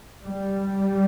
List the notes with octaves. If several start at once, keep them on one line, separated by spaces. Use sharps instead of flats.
G3